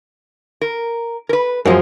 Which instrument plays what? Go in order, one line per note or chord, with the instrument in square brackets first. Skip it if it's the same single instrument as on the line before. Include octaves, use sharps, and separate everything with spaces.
[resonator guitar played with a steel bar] A#4
A#4 B4
[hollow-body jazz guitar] F#2 F3 [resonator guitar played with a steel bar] G#3 A#4